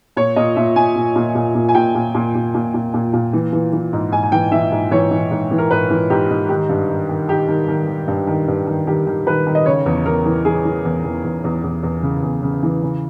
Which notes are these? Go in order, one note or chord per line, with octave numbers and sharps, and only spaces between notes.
A#2 C#5
A#2 D#5
A#2 E5
A#2 G#5
A#2
A#2
A#2
A#2
G#5
A#2 G5
A#2
A#2
A#2
A#2
A#2
A#2
A#2
E3
E3
E3
G#2
G#2 G#5
G#5
E3 G5
E3 E5
G#2
E3 C#5
E3
G#2
E3
A#4
G#2 B4
E3
G#2 G4
G#2
D#3 G4
G2
D#3
D#3
D#3 G4
D#3
D#3
D#3
G2
D#3
G2
D#3
D#3 G4
D#3
D#3 B4
D#3
D#5
C#3 C#5
E2
E2 A#4
E3
E3 G#4
E3
E2
E2
E2
E2
E2
E2
C#3
E2
C#3
E3
C#3